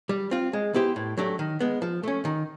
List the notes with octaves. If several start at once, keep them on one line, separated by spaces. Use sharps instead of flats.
G3
C4 F4
G#3
B3 E4 G4 C5
A2
F#3 A3 D4 G4
D#3
G#3 B3
F3
A3 C#4
D#3